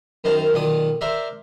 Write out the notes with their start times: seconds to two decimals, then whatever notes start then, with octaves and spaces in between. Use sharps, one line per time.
0.24 F#2 D#3 D#4 C5 A5 A#5
0.53 B1 A#2 D#3 D5 D#6
1.01 A#4 C5 D5 E5